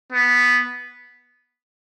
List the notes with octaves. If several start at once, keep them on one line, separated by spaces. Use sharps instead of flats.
B3